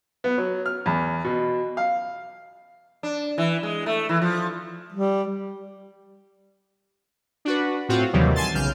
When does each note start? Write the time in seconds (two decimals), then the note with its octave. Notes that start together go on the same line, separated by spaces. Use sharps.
0.24 B3
0.38 F#3
0.66 F6
0.86 E2
1.24 B2
1.77 F5
3.03 D4
3.38 E3
3.63 G#3
3.86 A3
4.09 E3
4.22 F3
4.93 G3
7.45 D4 F#4 B4
7.89 A2 C4 F4 F#4
8.13 D#2 C3 D#3 E3 F#3 G3
8.36 G#5 A5 C6 A6
8.54 B1 C#3 F6 G6